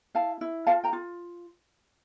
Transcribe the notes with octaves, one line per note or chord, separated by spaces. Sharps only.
E4 F5 A5
E4
F4 F5 A5
G5 A#5
F4